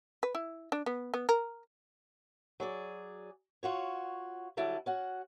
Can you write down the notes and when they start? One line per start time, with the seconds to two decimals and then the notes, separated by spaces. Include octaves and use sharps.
0.23 B4
0.35 E4
0.72 D4
0.86 B3
1.14 B3
1.29 A#4
2.60 F#3 G#4 D5
3.63 F4 F#4 C#5
4.57 D3 F#3 G3 E4 A5
4.86 C#4 F#4 F#5